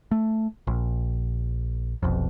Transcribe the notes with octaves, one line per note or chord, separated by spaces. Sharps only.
A3
A#1
F1 B1 F2